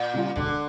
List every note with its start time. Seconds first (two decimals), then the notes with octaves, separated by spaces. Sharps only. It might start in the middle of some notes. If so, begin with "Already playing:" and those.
Already playing: A#2
0.14 C#3 G3 C#4 F4
0.36 E1 D3